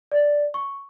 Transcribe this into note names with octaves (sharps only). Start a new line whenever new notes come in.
D5
C#6